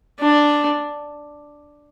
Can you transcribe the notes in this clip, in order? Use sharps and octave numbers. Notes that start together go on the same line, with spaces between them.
D4